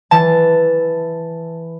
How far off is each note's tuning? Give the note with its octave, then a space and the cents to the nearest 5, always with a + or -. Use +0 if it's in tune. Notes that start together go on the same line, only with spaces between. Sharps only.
E3 +0 A5 +0